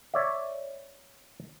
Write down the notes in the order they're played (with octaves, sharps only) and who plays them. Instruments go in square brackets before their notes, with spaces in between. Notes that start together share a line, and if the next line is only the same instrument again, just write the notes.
[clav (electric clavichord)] C#5 D5 E5